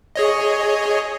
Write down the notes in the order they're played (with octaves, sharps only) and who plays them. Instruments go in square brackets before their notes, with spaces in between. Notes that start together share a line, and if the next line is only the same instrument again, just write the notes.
[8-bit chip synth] G#4 C#5 D#5